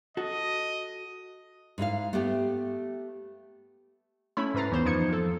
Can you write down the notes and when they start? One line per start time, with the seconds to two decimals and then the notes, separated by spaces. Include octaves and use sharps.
0.17 F#4 A4 D#5
1.78 G#2 E4 G#4 F5
2.13 A3 B3 G4
4.37 A3 C#4 E4 C#5 B5
4.54 G#2 C#4 B4 A#5 A6 C7
4.71 D#2 E3 B3 C5 E7
4.85 F2 F3 D#4 G#6 C#7
5.09 F3 A4